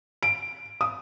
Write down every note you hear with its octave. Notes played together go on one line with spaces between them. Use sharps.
D7
D#6